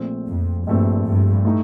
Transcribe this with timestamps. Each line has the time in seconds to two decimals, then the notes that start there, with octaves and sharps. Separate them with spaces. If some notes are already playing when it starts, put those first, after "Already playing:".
Already playing: A#1 A#2 A3 C4
0.28 F2
0.67 A#1 G2 A#2 A3 C4
1.06 G2
1.45 A2 A3 D#4